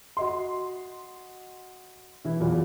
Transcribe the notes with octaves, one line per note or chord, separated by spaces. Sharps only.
F#4 D#5 C6
E3 E4
E2 A#2 F#3